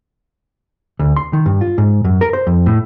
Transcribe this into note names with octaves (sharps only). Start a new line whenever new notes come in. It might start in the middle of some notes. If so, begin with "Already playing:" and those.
D2
C6
D#3
G2
F4
G#2
F#2
A#4
C5
F2
A2